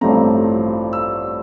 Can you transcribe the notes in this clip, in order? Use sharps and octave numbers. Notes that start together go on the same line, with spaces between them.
A1 G2 F3 A3 C4 A#5
E6